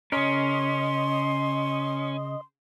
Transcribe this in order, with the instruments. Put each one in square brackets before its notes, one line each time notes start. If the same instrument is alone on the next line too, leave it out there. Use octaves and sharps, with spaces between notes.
[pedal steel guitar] C#3 A#4 [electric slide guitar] C#4 [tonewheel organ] D#5 [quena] C6